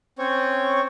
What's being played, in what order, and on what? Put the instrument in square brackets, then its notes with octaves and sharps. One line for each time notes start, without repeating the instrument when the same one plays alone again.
[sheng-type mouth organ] C4 C#4 C#5